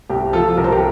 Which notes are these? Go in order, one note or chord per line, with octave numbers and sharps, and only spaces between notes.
C2 G4
F3 F4 A4
C2 A#4
C5
G4 A#4